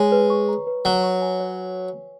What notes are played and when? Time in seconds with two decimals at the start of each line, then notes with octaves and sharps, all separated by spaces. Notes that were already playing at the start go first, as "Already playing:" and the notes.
Already playing: G#3 C#5
0.12 B4
0.30 C#6
0.49 A#5
0.67 B4
0.85 F#3 C#5
1.03 C#6
1.22 G#5
1.40 C#5